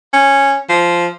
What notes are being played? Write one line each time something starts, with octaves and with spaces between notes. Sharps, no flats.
C#4
F3